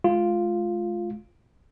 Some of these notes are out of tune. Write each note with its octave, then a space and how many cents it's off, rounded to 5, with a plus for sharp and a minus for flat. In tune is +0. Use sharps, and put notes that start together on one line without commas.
G#3 +35 F4 +0